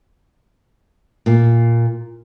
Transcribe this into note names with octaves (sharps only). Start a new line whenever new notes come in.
A#2